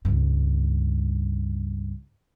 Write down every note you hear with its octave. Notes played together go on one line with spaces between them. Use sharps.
C#2 G2